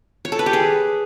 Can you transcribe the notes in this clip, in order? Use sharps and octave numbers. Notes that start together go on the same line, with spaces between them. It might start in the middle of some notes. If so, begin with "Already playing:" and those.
C#5
A4
B4
G4
G#4